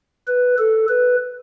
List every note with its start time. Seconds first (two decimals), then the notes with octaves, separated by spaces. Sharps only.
0.28 B4
0.59 A4
0.89 B4